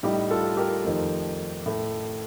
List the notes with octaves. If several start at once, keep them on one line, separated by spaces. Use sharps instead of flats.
A2 G3 D#4 G4
F4 A4
G4 A#4
F2 D#3 A3
A2 A3